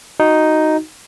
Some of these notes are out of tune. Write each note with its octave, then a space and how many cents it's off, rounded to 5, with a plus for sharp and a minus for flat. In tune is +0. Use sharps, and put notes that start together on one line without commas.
D#4 +0 F#4 +0